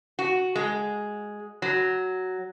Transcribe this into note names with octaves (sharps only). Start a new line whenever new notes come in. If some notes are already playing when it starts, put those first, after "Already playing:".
F#4
G#3
F#3